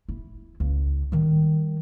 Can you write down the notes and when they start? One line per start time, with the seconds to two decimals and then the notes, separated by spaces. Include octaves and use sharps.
0.09 E4
0.60 C#2
1.12 D#3 G3